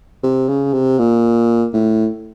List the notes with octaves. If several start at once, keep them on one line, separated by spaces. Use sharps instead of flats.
C3
C#3
C3
A#2
A2